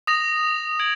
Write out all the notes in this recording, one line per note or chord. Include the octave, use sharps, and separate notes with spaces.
D#6 A#6 F7
D#6 G#6 D7 F#7